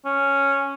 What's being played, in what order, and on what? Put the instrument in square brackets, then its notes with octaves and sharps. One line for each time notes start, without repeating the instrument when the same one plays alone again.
[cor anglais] C#4